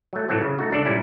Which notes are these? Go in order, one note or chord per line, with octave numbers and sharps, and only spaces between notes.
F#3 A3
A2 E3 F#3 A3 C4
C#3
A3 D#4 F#4
C#2 D4 A4 D5
A#2 G3 C#4 E4